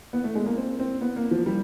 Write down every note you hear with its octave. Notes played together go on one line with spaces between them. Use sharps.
B3
A3
G#3
A#3
C4
C4
B3
A#3
F3
G3